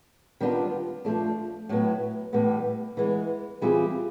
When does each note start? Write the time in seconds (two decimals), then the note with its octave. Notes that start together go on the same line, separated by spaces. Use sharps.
0.40 D#3 G3 B3 D4 F4
1.05 F3 A3 D4
1.69 A2 F#3 B3
2.33 A2 E3 G3 B3
2.97 E3 G#3 B3
3.62 E3 G3 C4 F4 G#4